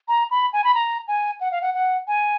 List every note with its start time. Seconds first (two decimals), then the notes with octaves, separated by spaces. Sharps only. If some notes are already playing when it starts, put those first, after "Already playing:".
0.08 A#5
0.31 B5
0.53 G#5
0.64 B5
0.75 A#5
1.08 G#5
1.41 F#5
1.51 F5
1.61 F#5
1.74 F#5
2.08 G#5